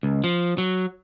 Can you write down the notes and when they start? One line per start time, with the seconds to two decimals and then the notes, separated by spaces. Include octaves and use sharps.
0.03 C#2
0.24 F3
0.58 F#3